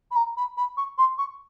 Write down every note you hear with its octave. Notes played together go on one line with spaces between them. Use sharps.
B5
A#5
B5
B5
C#6
C6
C#6